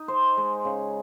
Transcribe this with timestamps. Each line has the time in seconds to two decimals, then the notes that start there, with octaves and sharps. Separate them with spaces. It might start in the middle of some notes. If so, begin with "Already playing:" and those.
Already playing: D#4
0.08 C5
0.37 G#3
0.65 C#3